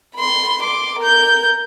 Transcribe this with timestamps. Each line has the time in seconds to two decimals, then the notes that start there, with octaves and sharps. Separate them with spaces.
0.15 B5 C6
0.62 C6 D6
0.99 A#4 G6